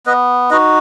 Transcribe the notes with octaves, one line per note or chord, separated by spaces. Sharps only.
B3 B4 D#5
D#4 F#4 B4 D#5